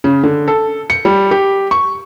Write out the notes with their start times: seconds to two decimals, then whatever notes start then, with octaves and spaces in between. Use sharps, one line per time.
0.04 C#3
0.23 D3
0.48 A4
0.90 C#7
1.05 G3
1.31 G4
1.71 C#6